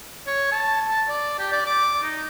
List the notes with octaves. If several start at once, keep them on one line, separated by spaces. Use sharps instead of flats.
C#5
A5
A5
D5
G4
D5
D6
D#4